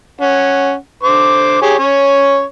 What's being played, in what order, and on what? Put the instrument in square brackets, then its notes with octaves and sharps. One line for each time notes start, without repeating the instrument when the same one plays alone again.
[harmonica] C#4 F#5
D3 C5 D6
G4 G#4 C#5
C#4 C#5